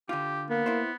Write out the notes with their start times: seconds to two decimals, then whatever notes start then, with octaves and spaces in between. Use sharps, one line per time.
0.09 D3 F4 G4
0.50 A#3 B3
0.66 E4 C5